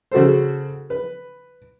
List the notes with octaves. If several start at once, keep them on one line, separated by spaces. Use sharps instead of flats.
C#3 F#4 A4 C5
B4